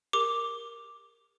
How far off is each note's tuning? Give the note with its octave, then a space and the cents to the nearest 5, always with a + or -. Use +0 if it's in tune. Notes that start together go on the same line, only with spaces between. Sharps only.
G4 +45 A#4 +0 D6 +0